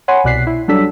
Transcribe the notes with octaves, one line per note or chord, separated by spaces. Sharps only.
C#5 F#5 G#5 B5 C6
C2 B2 D5 F#6 B6 C7
E4
F#3 G3 D4 A4 E6 B6